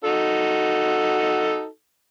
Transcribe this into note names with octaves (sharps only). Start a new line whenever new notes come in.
D#4 F#4 A4